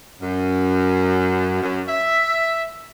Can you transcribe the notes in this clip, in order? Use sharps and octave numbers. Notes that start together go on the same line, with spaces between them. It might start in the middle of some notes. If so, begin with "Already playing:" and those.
F#2
F#2
E5